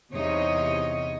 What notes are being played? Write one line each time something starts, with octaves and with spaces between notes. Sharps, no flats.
E2 C3 D#4 C#5 D#5